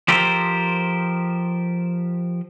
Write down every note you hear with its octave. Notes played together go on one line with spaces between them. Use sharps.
F3 G4 A4 A#4 C5